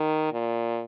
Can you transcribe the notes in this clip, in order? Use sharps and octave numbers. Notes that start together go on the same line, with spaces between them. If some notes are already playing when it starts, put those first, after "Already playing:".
Already playing: D#3
A#2